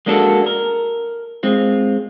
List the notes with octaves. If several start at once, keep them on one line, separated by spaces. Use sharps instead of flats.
G#3 A#3 D4 F#4 A4
A#4
G#3 C4 F4